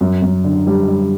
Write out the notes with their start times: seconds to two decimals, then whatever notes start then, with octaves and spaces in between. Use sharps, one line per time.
0.01 F#2
0.22 F#2
0.44 D3
0.67 G3
0.88 G3